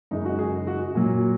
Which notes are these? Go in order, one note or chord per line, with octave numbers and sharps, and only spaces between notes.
F#2 C#3 G#3 D#4
F#4
G#4
F#4
A#2 F#3